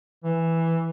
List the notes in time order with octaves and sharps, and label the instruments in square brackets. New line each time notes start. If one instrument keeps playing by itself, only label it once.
[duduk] E3